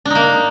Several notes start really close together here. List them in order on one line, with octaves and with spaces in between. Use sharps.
D4 D#4 A#3